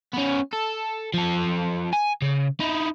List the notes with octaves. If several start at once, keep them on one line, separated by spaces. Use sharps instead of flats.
B3 C#4
A4
F3 A4
G#5
C#3
D#4 E4